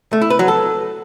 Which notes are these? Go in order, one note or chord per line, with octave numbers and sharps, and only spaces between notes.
A3
E4
B4
F#3
A4